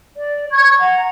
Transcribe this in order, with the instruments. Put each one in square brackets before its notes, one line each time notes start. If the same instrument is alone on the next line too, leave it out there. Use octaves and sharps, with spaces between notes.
[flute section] D5
C#6 G#6
F#5 A#5